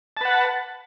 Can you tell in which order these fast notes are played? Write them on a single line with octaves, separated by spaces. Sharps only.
A5 B4 F#5